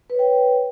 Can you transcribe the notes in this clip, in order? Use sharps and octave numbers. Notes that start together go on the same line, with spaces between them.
B4 C#5 G5